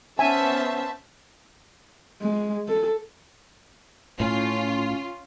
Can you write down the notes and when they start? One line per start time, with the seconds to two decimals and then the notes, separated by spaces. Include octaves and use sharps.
0.19 B3 C#4 C5 E5 G#5 A5
2.22 G#3
2.68 A4
4.20 A2 C#4 F4